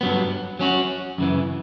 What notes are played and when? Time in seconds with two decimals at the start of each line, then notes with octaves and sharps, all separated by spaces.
0.01 G2 F#3 B3
0.59 F#3 C#4 F#4
1.18 F#2 C#3 E3